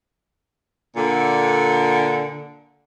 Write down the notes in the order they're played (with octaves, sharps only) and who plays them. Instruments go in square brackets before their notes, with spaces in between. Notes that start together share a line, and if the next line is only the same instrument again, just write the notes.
[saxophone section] A#2 D3